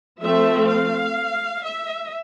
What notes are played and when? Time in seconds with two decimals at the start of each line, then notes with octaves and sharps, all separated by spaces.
0.21 F3 A3 C4 E5
0.69 F5
1.63 E5